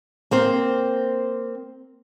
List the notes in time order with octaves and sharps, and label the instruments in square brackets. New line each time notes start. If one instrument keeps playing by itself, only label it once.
[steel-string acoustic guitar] A#3 C4 C5